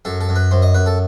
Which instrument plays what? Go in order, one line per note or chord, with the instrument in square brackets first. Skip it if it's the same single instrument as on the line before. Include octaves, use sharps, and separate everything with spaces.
[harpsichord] F#2 A4
A4
F#2
B4
F#2 C5
D#5
F#2 B4
A4